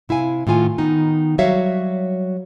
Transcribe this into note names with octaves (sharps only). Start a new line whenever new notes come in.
C3 E4 F5 G#5
A2 D#3 F4 G#5
D#3 B3 D#4
F#3 G3 F#4 C#5 E5 F5